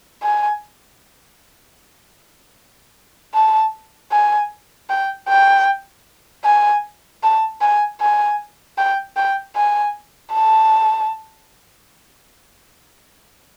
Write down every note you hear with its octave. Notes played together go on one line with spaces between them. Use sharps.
G#5
A5
G#5
G5
G5
G#5
A5
G#5
G#5
G5
G5
G#5
A5